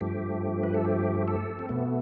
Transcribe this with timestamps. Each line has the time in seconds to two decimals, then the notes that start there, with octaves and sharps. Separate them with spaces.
0.01 G2 F3 A3 G4
0.63 B4
0.74 A4
0.85 G4
1.28 A4
1.59 C4
1.69 B2 A3 B3